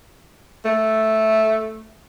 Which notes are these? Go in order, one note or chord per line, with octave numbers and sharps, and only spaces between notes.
A3